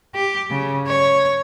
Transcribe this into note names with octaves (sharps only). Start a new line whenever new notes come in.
G4
C#3
C#5